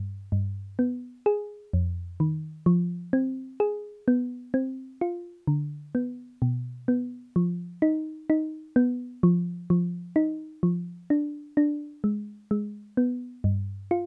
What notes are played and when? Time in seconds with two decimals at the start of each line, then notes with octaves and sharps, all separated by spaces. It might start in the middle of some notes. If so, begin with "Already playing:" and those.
Already playing: G2
0.32 G2
0.79 B3
1.26 G#4
1.73 F2
2.20 D#3
2.66 F3
3.13 C4
3.60 G#4
4.08 B3
4.54 C4
5.01 F4
5.47 D3
5.95 B3
6.42 B2
6.88 B3
7.36 F3
7.82 D#4
8.30 D#4
8.76 B3
9.23 F3
9.70 F3
10.16 D#4
10.63 F3
11.10 D4
11.57 D4
12.04 G#3
12.51 G#3
12.97 B3
13.44 G2
13.91 F4